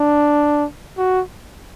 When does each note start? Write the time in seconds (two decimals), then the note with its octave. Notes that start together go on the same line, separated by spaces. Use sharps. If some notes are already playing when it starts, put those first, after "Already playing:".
Already playing: D4
0.98 F#4